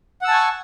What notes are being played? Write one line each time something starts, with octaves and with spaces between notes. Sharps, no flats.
F#5 G#5 A5 C#6 E6